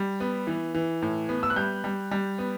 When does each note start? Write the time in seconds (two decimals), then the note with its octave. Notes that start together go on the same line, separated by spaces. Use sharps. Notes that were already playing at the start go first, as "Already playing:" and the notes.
Already playing: G3
0.20 B3
0.47 E3
0.74 E3
1.02 A2
1.29 B3
1.43 E6
1.50 F#6
1.56 G3 G6
1.84 G3
2.11 G3
2.38 B3